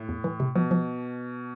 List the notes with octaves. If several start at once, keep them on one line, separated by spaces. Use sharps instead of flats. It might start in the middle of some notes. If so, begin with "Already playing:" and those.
Already playing: A2
E2
E3
C3
B2 F3
F3